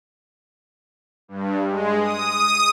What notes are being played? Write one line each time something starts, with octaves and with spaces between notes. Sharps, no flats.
G2
G#3
D#6